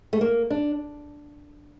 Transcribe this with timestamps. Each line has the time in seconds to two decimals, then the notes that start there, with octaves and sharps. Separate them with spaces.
0.13 A3
0.21 A#3
0.50 D4